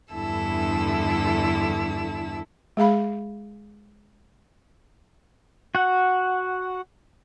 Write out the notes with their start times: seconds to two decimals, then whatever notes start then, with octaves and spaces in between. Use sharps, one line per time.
0.14 E2 G2 D3 E4 A4 E6
2.77 G#3 G#4 F5 B5
5.75 F#4 F#5